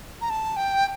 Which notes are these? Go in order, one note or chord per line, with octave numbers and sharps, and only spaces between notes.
A#5
A5
G5